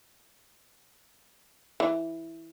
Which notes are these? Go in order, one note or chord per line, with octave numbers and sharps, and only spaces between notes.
E3